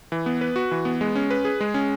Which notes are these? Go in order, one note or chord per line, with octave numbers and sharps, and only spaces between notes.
E3
B3
B4
F#4
E3
B3
G#3
C#4
B4
G#4
G#3
C#4